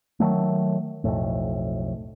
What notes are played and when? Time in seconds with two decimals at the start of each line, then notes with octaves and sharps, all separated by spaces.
0.20 D#3 F#3 A3
1.04 B1 F2 A2